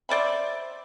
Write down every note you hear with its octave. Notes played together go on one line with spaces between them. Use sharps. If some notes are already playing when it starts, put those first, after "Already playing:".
C5 D5 E5 B5